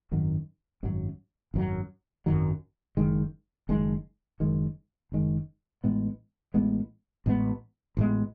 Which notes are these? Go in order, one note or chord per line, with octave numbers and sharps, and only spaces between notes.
G#1 F#2 D#3 F#3
G#1 F#2 D#3 F#3
G#1 F#2 D#3 F#3
G#1 F#2 D#3 F#3
F#1 F#2 D#3 G#3
F#1 F#2 D#3 G#3
F#1 F#2 D#3 G#3
F#1 F#2 D#3 G#3
A1 A2 G#3 B3
A1 A2 G#3 B3
A1 A2 G#3 B3
A1 A2 G#3 B3